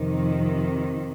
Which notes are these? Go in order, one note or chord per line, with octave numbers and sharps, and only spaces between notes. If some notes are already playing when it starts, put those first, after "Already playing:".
Already playing: F2 C3 D#3